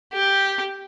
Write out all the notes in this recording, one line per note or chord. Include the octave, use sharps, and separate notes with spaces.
G4